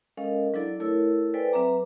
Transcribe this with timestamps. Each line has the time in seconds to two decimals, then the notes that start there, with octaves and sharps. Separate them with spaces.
0.17 G#3 C#4 A4 A#4 D#5 F5
0.54 F#3 D4 E4 A4 D5
0.80 A3 E4 A4 A#4 C#5 E6
1.34 A4 B4 C5 D5 G5 G#5
1.53 F#3 C4 B4 E5 A#5 D6